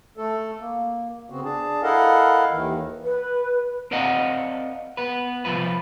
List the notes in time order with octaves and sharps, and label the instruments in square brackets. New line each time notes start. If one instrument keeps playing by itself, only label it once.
[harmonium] A3 A4
A#3
C#3 B3 C4 F#4
D4 G#4 A5
E4 A4 A#4 D#5 F5 F#5
D#2 D#3 E3
[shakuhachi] B4
[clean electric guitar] C4 A#4 D5 D#5 F5 F#5
B3 B4
C2 F2 F3 F4 B4